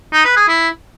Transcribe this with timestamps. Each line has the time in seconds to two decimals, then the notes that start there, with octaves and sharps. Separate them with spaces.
0.13 D#4
0.25 B4
0.36 G#4
0.48 E4